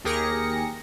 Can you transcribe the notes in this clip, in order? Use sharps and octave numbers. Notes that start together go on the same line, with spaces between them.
D#2 G4 G#4 A#4 A#6 C#7